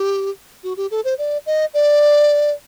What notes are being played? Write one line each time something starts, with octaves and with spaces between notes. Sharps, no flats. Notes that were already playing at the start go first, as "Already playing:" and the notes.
Already playing: G4
F#4
G4
A4
C5
D5
D#5
D5